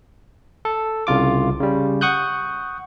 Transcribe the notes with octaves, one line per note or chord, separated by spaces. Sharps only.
A4
C2 C#3 F4 D6
C#3 G3
F#5 C#6 D#6 F#6 G6